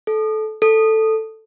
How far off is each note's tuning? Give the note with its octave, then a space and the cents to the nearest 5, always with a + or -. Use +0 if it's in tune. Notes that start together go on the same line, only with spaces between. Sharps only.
A4 -20
A4 +5